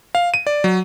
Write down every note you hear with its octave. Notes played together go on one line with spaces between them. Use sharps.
F5
D#7
D5
F#3